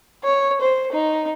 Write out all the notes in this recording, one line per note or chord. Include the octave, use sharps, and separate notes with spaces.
C#5
C5
D#4